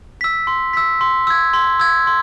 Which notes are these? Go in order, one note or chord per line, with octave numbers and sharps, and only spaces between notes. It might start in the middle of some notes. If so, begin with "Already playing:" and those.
E6 B6
C6
E6 B6
C6
E6 G#6
C6
E6 G#6
C6